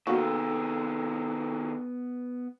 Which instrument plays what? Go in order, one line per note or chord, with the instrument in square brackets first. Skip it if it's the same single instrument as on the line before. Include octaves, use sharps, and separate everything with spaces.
[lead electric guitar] C3 D#3 [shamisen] A#3 F#4 [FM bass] B3 [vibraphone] A4 G5 E6